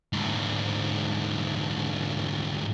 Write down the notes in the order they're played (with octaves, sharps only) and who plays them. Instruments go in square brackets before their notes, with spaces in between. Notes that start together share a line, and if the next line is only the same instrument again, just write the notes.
[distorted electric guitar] D2 G#2